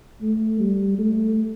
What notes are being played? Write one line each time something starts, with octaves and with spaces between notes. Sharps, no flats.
A3
G3
A3